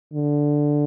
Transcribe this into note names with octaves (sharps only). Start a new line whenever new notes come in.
D3